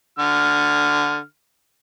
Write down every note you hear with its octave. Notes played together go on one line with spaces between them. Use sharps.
D3 F6